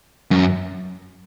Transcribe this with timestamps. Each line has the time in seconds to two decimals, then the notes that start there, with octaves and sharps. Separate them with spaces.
0.31 F#2